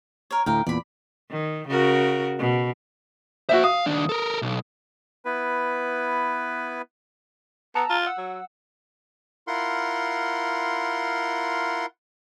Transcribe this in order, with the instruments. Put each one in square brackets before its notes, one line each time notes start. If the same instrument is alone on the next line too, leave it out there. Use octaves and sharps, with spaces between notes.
[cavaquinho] A#4 C#5
[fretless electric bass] D2 A2 [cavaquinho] A#4 F5 G5
[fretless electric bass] E2 A#2 [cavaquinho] D5 B5
[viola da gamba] D#3
C#3 F#4 A#4
B2
[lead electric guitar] A#3 C5 [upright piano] F#4 E5
[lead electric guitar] F5 [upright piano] D#6
[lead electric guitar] D#2 D4
A4 A#4
B1
[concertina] B3 E4 B4
[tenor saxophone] B3 [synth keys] A5 A#5 E6
[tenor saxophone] F4
[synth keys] F#5 E6
[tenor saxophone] F#3
[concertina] E4 F4 A#4 F#5 C6